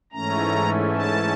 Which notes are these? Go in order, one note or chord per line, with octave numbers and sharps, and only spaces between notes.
G#2 E3 A3 C#4 A#5
A5